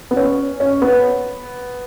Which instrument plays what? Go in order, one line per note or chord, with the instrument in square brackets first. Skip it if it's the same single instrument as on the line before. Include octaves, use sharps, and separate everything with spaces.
[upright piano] B3
C#4
C#4
B3